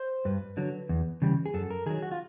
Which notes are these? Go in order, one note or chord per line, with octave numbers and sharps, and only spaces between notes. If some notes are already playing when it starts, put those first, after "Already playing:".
Already playing: C5
G2 B4
D3 F#3
E2
C#3 E3 G3
G#4
F#2 A4
A#4
D#3 F#3 G#4
F#4
F4